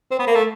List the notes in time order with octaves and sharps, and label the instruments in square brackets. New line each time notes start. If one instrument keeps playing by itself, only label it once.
[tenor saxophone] C4
B3
A#3
A3